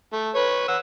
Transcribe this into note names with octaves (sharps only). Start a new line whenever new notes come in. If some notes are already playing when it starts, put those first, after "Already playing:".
A3
B4 C#5
F#5 E6